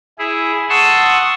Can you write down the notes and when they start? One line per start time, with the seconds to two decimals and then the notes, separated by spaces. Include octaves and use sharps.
0.19 E4 G#4
0.69 F#5 A5 C6 C#6 D#6 E6